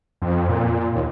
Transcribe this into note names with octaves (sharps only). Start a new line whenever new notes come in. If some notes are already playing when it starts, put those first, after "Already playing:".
F2
A#2
D#2